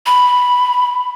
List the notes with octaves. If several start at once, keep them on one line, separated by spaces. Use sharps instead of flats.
B5